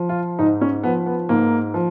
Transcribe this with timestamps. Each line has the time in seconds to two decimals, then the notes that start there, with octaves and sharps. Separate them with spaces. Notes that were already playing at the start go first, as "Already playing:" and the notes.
Already playing: F3
0.09 F4
0.39 G#2 D#4
0.61 C#4
0.83 F3 B3
1.06 B3
1.29 G#2 A#3
1.74 F3